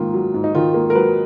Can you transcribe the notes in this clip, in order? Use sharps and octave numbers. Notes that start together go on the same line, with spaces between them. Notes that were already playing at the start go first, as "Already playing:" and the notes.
Already playing: G#2 D#3 A#3 F4
F#3
G#2
D#4
D#3 F4
A#3
A#4
F#3 B4